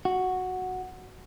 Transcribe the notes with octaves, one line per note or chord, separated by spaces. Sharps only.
F#4